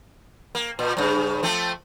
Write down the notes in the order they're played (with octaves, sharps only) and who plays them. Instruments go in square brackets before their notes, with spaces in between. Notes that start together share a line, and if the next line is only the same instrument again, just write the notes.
[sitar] A#3
A#2
G2 C#3
F3 A3 C4